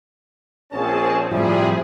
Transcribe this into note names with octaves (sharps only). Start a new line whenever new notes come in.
A#1 C4 C#4 G#4 C5 A5
A2 C3 F3 G3 G#4 E5